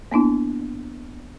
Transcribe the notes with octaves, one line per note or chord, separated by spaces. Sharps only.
A#3 B3 D4 E4